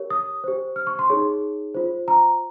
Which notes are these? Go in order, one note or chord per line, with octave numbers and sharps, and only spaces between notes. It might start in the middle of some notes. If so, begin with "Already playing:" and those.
Already playing: G4 A#4 C#5
D#6
G4 C5
F6
C#6
C6
D#4 G#4 C#5
F4 C5
A#5